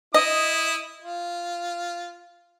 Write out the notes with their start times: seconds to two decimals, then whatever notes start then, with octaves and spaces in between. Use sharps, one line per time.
0.14 E4 D#5 D#6
1.02 F4